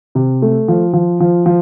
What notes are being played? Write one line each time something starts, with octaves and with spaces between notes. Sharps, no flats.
C3
A3
F3
F3
F3
F3